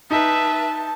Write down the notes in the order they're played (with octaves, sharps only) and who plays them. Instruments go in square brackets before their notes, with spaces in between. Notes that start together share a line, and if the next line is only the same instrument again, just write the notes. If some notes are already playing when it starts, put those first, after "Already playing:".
[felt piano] D#4 [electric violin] B4 E5 [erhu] A5